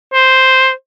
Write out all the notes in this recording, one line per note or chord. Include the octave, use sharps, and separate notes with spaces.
C5